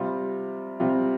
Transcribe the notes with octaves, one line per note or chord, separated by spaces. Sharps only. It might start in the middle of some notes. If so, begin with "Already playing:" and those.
Already playing: C3 G3 C4 F4
C3 G3 C4 F4